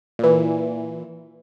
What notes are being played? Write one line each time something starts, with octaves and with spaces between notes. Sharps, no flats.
A#2 E3